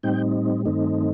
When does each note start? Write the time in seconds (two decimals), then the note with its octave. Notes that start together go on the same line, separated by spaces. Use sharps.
0.03 A2 G3 C4 D#4 G5
0.65 G2 D#3 A3 C4 D#4